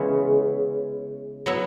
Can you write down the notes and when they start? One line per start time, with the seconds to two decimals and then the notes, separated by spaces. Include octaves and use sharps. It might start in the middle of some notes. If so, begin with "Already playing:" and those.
Already playing: C#3 E3 G#3 B3 G#4
1.46 F#3 B3 E4